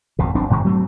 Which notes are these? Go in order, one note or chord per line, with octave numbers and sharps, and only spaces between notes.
G#1 F2 B2
E1 B1 C4 D4
F#1 G#2 D#3 G#3
F#3 A3 B3 C4